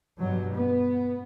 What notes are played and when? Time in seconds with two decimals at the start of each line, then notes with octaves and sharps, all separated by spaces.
0.19 G2 B2 F#3
0.55 B3